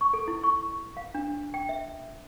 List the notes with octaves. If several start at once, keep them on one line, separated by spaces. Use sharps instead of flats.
C#6
A4
E4
C#6
F5
D4
G5
E5